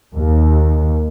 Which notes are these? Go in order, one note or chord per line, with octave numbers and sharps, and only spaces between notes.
D#2